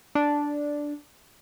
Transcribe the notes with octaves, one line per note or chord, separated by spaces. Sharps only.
D4